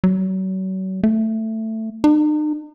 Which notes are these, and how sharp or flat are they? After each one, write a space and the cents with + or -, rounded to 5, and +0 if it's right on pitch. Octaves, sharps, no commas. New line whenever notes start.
F#3 +35
A3 +10
D#4 -45